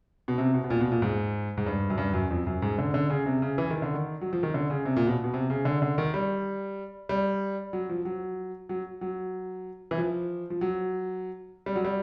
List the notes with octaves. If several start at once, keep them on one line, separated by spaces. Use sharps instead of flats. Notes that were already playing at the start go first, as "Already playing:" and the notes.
B2
C3
B2
B2
A#2
B2
A#2
G#2
G#2
G2
F#2
G2
F#2
F2
F#2
G#2
D3
D3
C#3
C3
C#3
E3
D#3
D3
D#3
F#3
F3
D#3
D3
C#3
C3
A#2
B2
B2
C3
C#3
D3
D3
D#3
G3
G3
F#3
F3
F#3
F#3
F#3
E3
F3
F3
F#3
G3
F#3
G3